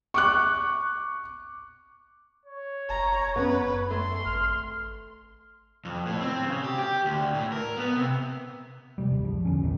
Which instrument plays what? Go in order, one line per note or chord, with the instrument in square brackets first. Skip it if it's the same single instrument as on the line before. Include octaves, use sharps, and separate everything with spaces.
[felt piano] C#6 D6 F#6
[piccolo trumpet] C#5
[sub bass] F#1 [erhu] A#5
[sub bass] F#2 [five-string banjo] B3 C#4 [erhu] B4
[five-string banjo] A3 [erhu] C6
[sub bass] G#1 [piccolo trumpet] F6
[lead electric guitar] F2
A2
C4
C#3
G4
G4
D2
A2
A#4
B3
C3
[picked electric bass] C3 G3
D#1 G#1 G2
C#2 F3
E2 D3 C#4
A#1 A#2 D#3